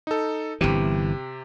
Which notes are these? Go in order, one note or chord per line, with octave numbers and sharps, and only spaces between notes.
D#4 A4
G1 C3 E3 G4